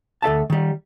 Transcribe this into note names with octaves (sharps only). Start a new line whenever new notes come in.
D2 A4 E5 A5
D#3 G3